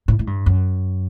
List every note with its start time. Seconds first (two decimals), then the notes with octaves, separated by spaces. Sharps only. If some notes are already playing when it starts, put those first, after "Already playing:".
0.08 A2
0.19 A2
0.27 G2
0.46 F#2